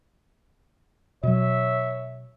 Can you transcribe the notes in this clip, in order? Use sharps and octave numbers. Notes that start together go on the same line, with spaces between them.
B2 F#3 C#5 E5